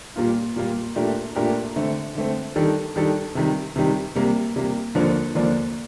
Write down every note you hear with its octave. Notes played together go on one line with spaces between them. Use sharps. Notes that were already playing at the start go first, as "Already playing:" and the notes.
A#2 G3 A#3 F4
A#2 G3 A#3 F4
A#2 A3 D4 G4 A#4
A#2 A3 D4 G4 A#4
D3 A3 C4
D3 A3 C4
D#3 G3 D4 A4
D#3 G3 D4 A4
C3 D#3 G3
C3 D#3 G3
C3 G3 A#3
C3 G3 A#3
D#2 D3 F3 A#3 D4
D#2 D3 F3 A#3 D4